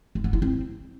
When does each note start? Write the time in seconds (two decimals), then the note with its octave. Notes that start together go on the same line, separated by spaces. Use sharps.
0.15 A3
0.24 B3
0.33 E4
0.42 C4